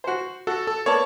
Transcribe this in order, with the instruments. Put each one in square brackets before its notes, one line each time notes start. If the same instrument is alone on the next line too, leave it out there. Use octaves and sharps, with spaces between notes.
[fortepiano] F#4 C5
[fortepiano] F#4 [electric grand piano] A4
[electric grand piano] A4
[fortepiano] A#3 B3 D5 [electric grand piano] C#5 A5